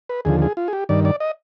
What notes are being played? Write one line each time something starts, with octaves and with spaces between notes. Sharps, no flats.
B4
D#2 D3 F3 G#4
G#4
F4
G#4
G4
G2 D#3 D5
D5
D#5